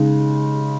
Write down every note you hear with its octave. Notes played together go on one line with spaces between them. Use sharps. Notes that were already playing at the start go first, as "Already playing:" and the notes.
Already playing: C#3 G#3 D#4